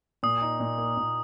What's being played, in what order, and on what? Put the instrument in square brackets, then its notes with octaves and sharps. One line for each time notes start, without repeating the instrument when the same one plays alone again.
[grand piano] A#2 [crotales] D#6
[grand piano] D#4
A#2
A#3
A#2